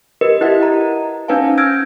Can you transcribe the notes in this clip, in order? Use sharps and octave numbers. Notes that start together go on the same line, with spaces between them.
G4 A#4 B4 D#5
E4 G4 A#4 D#5 E5 F#5
A#5
C#4 D#4 B4 C5 F5 A5
E6 F6 G6 G#6 A#6 D7